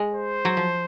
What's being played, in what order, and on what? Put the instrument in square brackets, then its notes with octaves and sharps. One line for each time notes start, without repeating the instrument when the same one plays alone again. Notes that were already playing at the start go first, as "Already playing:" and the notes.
Already playing: [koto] G#3
[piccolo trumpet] C5
[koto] F#3
F3